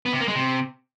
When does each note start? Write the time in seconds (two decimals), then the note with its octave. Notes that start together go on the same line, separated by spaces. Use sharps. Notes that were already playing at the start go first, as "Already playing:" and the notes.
0.06 B3
0.13 C3
0.21 A#3
0.28 G#3
0.36 C3